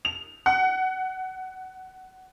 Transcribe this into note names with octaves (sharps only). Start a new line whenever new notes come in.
F7
F#5